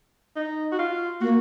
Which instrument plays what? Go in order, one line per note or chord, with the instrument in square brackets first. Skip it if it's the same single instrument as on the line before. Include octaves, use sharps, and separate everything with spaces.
[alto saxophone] D#4
F#4
F4
[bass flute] A#3 [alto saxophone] F#4